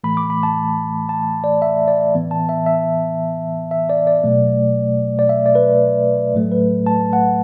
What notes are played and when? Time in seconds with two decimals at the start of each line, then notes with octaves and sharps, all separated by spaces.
0.03 A2 E3 A3 B5
0.17 D6
0.30 B5
0.43 A5
1.09 A5
1.44 D5
1.62 E5
1.88 D5
2.15 A2 E3 B3
2.31 A5
2.49 E5
2.66 E5
3.71 E5
3.89 D5
4.07 D5
4.24 B2 F#3 A3
5.19 D5
5.29 E5
5.46 D5
5.55 B4
6.34 A2 F#3 A3
6.52 B4
6.87 A5
7.13 F#5